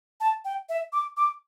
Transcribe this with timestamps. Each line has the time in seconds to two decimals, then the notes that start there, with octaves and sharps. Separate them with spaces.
0.20 A5
0.45 G5
0.69 E5
0.93 D6
1.17 D6